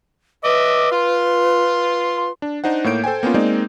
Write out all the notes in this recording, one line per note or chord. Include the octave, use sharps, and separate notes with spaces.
B4 D#5 E5 D6
F4 C6
D4
D4 D#4 C5 F#5
A2 A#3 C#5 G6 D7
A4 C5 G5 G#5
A#3 B3 C#4 F4
G#3 A#3 C4 D#4 D5